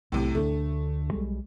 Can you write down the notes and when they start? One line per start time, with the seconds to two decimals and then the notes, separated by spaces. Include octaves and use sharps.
0.12 B1 A2 C3
0.35 D2 A3 C#4 D4
1.11 B1 G3 G#3